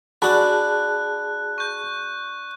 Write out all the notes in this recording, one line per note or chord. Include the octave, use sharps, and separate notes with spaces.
D4 F#4 G#4 A5 B5 F#6
C#6 G6